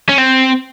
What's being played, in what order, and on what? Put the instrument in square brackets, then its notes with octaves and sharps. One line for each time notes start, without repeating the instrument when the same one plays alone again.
[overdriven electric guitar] C#4
C4